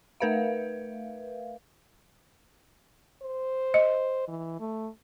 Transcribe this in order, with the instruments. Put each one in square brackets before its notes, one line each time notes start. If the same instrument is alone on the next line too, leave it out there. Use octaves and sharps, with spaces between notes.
[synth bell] A3 A#4 B4 E5 F5
[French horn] C5
[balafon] D#5
[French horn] E3
A3